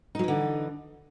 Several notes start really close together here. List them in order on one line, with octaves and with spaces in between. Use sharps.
D#4 F#3 E3 D3